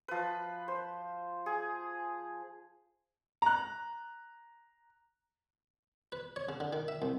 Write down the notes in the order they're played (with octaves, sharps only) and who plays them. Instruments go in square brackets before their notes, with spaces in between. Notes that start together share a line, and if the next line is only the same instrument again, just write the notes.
[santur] F3 B4
C5
G#4
[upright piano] A#5 F#6
[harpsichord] B4
C#5
C#3
D3
D#3
E5
C2